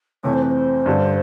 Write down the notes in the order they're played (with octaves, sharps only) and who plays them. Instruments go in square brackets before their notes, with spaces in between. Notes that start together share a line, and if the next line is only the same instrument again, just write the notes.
[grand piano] F2 C3 E3 A3 [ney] C#5
[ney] C5
B4
C5
[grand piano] G2 D3 G3